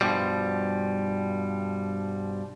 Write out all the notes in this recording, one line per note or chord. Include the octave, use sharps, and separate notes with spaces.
G2 B2 F3 G3